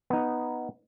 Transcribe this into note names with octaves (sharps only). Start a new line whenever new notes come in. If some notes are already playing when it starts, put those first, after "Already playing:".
B3 D#4